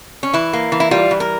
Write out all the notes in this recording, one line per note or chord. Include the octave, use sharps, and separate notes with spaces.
C#4
E3 E4
A#3
E3
E4
G3 F4
E3
A#4